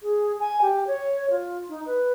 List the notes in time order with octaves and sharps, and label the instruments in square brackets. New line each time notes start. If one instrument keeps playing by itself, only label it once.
[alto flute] G#4
G#5
G4
C#5
F4
D#4
B4